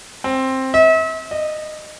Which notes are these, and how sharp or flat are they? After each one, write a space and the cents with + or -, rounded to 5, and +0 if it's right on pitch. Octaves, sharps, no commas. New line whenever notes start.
C4 +10
E5 -40
D#5 -20